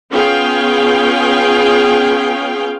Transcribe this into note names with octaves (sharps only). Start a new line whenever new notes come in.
B3 C#4 F4 G#4 F5 G5